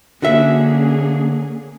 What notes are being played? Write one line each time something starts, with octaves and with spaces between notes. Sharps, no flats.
D3 A#3 C#4 F#4 G#4 E5